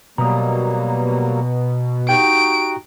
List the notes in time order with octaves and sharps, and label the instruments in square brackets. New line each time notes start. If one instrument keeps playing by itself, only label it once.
[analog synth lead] B2 [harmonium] F#3 G3 A#3 [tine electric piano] A#5 D#6
[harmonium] D#4 F#4 [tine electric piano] G4 G5 [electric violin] D7